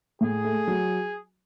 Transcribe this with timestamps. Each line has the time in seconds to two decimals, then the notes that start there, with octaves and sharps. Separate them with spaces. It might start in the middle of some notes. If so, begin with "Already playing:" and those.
0.21 A2 G#4
0.45 A3
0.68 F#3